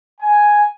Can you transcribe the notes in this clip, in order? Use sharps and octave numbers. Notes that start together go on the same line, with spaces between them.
G#5